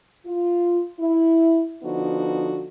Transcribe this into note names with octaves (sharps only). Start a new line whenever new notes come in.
F4
E4
D3 F3 B3 D#4 F#4